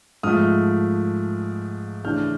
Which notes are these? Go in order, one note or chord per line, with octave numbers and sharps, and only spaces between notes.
G#2 F3 A3 D#6 F6
C#3 E3 A3 D4 F6 G6